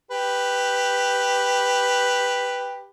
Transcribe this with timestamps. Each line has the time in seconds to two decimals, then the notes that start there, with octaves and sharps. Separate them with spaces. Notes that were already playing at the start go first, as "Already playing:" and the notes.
0.11 G4 B4